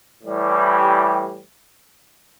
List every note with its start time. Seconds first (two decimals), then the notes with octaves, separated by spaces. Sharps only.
0.23 A2 E3 G3
0.82 G4